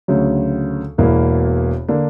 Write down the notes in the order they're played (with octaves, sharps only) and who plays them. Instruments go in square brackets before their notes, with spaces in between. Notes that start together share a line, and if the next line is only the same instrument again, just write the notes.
[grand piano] D2 C#3 F#3
E1 E2 B2 A#3 E4
D3 A#3 D4